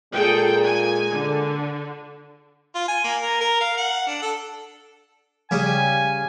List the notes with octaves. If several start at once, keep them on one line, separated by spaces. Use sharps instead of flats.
A#2 G#3 G#4 A4 G5
G#5
D3
F4
G#5
A#3
A#4
A#4
F5
F#5
D4
A4
C#3 G3 C#4 G#5